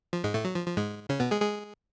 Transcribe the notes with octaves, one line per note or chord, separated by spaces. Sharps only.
F3
G#2 G#3
A2 A3
F#3
F3
F3
G#2 G#3
C#3 C#4
B2 B3
G#3 G#4
G#3 G#4